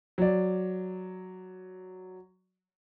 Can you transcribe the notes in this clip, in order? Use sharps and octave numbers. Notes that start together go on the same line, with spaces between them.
F#3 D5